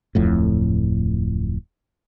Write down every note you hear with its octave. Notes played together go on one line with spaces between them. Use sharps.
D1 F2 A2